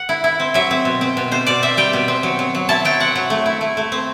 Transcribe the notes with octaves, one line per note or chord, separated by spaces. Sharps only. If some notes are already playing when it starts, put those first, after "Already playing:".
Already playing: F#5
E4
E4
C4
F#3 E5
C4
B2
C4
B2
B2 C5
B2 D5
C4 E5
G3 G5
B2
C4
F#3
F#3
F#3
E4 A5
F#3 G5
C4 F#5
F#3
A3
E4
A3
A3
C4